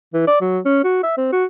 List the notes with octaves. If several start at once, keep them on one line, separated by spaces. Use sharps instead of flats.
E3
D5
F#3
C#4
F#4
E5
C4
F#4